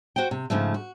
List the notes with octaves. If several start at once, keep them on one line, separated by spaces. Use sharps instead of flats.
F#4 C5 F#5 G5
C3
G#2 C#3 F3 A3
F#4